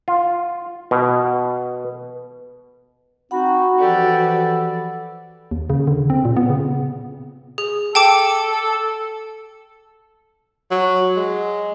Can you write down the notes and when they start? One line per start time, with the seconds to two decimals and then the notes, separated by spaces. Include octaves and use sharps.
0.08 F4
0.91 B2
3.31 C4 D#4 F#4 F#5 B5
3.78 E3 F3 F#4 G4 A4 D5
5.51 D#2
5.70 C#3
5.87 D3
6.10 C4
6.25 A#2
6.37 B3
6.50 C#3
7.58 G#4
7.95 A4 G5 A5 D6
10.71 F#3
11.16 G#3